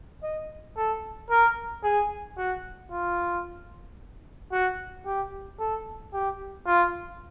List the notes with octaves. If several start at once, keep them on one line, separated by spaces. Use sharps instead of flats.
D#5
A4
A#4
G#4
F#4
F4
F#4
G4
A4
G4
F4